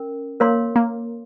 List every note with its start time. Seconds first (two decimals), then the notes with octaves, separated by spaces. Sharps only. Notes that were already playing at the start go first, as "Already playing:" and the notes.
Already playing: C#4 A#4
0.40 A#3 A#4 C#5 F5 C6
0.76 A#3